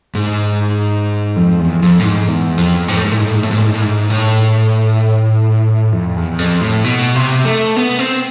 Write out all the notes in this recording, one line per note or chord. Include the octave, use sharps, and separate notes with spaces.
G#2
F2
E2
F2
A2
G#2
E2
F2
G#2
A2
G#2
A2
G#2
A2
G#2
A2
G#2
A2
G#2
A2
G#2
A2
F2
E2
F2
A2
B2
C3
A3
B3
C4